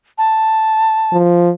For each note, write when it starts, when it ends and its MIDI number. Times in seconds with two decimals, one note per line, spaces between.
0.18 1.17 81
1.13 1.50 53